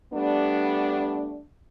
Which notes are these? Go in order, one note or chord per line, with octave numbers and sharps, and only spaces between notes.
G3 A3 B3 D4